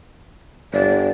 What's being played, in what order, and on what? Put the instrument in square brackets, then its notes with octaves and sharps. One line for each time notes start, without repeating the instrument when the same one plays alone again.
[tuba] G1 [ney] D5